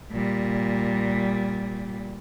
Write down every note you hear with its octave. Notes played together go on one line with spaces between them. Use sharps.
A#2 G3